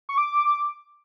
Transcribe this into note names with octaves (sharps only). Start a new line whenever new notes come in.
C#6
D6